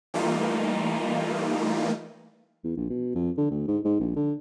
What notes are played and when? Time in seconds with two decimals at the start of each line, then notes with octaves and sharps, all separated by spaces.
0.14 E3 G3 A3 A#3 D#4 F4
2.64 E2
2.77 A#1
2.90 B2
3.15 F2
3.37 D3
3.50 D2
3.68 G#2
3.85 G#2
4.00 A#1
4.16 D3